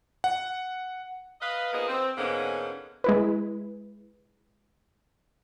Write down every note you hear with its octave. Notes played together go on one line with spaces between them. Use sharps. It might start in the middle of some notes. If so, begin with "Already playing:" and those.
F#5
B4 D#5 F5
F3 A#3 B3 D#4 G#4 D#5
C4
G#2 D3 G#3 A#3 B3 C#4
G#3 E4 B4